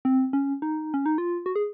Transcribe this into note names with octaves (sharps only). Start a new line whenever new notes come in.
C4
C#4
D#4
C#4
D#4
F4
F#4
G#4